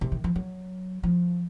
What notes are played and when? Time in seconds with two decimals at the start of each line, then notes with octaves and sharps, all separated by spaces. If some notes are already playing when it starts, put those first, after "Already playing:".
0.01 C3
0.12 D#3
0.24 F3
0.36 F#3
1.03 F3